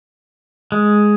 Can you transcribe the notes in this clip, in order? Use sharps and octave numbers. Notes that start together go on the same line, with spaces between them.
G#3